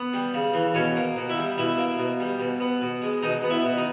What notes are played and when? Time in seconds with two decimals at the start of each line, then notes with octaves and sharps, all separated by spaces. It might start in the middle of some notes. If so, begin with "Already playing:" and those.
Already playing: B3
0.13 G3
0.34 C#3
0.54 E3
0.74 B2 C#4 C#5
0.96 A#3
1.16 B2
1.29 E4 E5
1.37 G3
1.58 B2 E4 E5
1.78 A#3
1.98 B2
2.20 G3
2.40 B2
2.60 B3
2.81 B2
3.02 G#3
3.23 B2 D#4 D#5
3.43 B3
3.50 E4 E5
3.64 B2
3.77 D#4